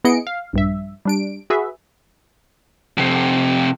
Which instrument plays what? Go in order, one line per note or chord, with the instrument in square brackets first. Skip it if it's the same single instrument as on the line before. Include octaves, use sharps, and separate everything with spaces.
[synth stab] B3 E4 G#4 D#5 C#7 D7
F5
A#1 G2 E5
G3 D4 D7
F#4 G#4 B4 E5
[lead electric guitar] F2 C3